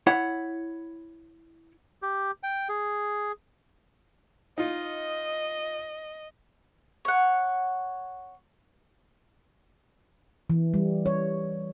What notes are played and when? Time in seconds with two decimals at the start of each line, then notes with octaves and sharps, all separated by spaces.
0.07 E4 C#5 F#5
2.02 G4
2.43 G5
2.69 G#4
4.58 D#4 F4 D#5
7.05 C#5 F#5
10.50 E3
10.74 G3
11.06 C#5